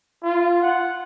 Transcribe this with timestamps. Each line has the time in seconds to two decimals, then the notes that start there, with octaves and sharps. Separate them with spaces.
0.23 F4
0.62 F#5